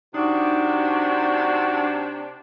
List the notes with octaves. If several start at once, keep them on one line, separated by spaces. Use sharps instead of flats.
C3 D4 D#4 F#4 D6